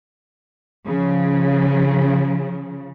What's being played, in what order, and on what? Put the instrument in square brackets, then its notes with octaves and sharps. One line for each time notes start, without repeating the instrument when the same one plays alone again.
[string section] C#3 F3